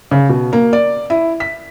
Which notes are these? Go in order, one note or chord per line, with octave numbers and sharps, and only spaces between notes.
C#3
B2
A#3
D5
E4
B6